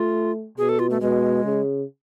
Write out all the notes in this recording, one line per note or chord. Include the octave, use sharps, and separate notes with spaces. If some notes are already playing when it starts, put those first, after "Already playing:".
Already playing: A3 F4
B2 G#4
A4
F4
A3
B2 G#3
C#3